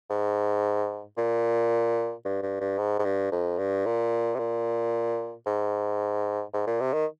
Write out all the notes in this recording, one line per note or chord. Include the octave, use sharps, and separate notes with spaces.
G#2
A#2
G2
G2
G2
G#2
G#2
G2
F2
G2
A#2
C3
A#2
G#2
G#2
A#2
C3
D#3